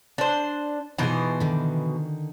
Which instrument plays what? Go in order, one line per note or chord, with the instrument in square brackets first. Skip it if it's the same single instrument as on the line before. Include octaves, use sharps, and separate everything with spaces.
[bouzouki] D4 C5
[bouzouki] B2 E3 C5 [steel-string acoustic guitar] D#4 F4 G#4
[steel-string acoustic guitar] D3 D#3